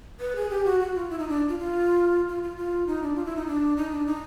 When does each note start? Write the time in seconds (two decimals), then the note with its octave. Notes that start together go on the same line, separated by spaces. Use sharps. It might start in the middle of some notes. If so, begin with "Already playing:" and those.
0.20 B4
0.36 G#4
0.50 G4
0.65 F#4
0.80 F#4
0.95 F4
1.10 E4
1.19 D#4
1.29 D4
1.49 F4
1.59 F4
2.28 F4
2.43 F4
2.57 F4
2.87 D#4
3.03 D4
3.15 F4
3.25 E4
3.36 D#4
3.47 D4
3.77 D#4
3.91 D4
4.06 D#4